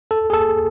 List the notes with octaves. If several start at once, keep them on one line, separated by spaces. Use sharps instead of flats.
A4
G#4
A4